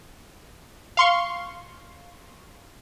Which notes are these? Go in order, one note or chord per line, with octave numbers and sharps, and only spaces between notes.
F5 C6 C#6